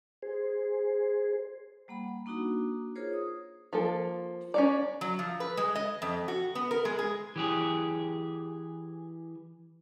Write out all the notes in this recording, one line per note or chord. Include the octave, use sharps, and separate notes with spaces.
G#4 C5
G3 A#3 F#5 B5
A#3 D4 D#4 F#4 A#5
F4 G#4 A#4 C5 C#5
D#6
F3 A#3 A4
C#4 C#5 D5
F#3
F3
B4
G#3
D#5
F2
F#4
B3
A#4
G#3
G#4
E3 G4 G#4